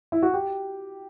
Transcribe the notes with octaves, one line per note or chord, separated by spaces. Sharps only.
E4
F#4
G4